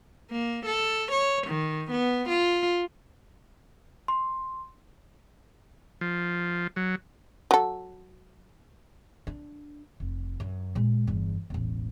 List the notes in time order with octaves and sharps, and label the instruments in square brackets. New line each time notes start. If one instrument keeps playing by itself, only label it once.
[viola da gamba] A#3
A4
C#5
D#3
B3
F4
[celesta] C6
[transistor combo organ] F3
F#3
[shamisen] F#3 A4
[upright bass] D4
F1
F#2
A#2 G#3
G1 E2
E1 A1